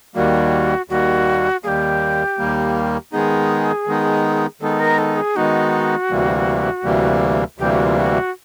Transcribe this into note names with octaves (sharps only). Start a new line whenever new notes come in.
D#2 D#3 G3 A#3 F#4
D#2 D#3 G3 A#3 F#4
D#2 D#3 G3 A#3 G4 G#4
D#2 D#3 G3 A#3
D#3 G#3 B3 D#4 G#4
D#3 G#3 B3 D#4
D#3 G#3 B3 D#4 A4
A#4
A4
G#4
D#3 G#3 B3 D#4 F#4
D2 C3 E3 G3 A#3
D2 C3 E3 G3 A#3
D2 C3 E3 G3 A#3 G4
F#4
F4
F#4